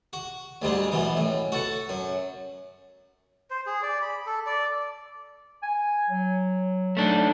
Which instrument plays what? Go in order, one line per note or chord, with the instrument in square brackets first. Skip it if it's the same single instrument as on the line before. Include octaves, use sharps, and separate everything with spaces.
[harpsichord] F#4
D2 G#2 G3 G#3
F#2 B2 E3
A2
F#4 A4 F#5
F#2
[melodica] C5
G#4
D5
B5
A4
D5
[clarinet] G#5
F#3
[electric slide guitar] A3 D4 D#4